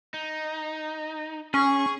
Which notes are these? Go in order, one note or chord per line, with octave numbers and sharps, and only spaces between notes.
D#4
C#4 G#4 C#6